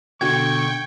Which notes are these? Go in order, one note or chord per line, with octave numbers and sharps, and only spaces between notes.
B2 D3 F#4 G5 C#6 G#6